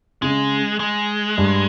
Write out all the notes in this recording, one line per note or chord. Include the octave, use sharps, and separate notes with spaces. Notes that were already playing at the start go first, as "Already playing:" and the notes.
C#3 G#3
G#3
G2